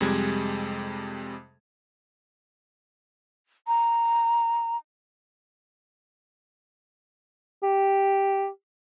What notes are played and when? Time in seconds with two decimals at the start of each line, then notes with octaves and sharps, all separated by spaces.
0.01 F2 C3 G3 G#3 G#6
3.67 A#5
7.63 G4